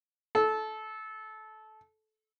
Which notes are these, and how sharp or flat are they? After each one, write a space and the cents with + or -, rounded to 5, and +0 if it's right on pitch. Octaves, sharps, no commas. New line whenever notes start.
A4 -20